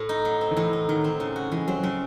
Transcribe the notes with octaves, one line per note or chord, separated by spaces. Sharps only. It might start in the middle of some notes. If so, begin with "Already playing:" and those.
Already playing: A2
D#4
F#3
C4
D#3
A2 E3
D#4
D#3 F#3
C4
C#3
F#4
E3 G#3
F#3 C4
C#3 F#3